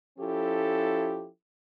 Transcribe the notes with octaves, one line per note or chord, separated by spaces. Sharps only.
F3 C#4 E4 G4 A4